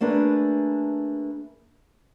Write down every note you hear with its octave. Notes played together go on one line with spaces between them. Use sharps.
A3 A#3 D4 G#4 B4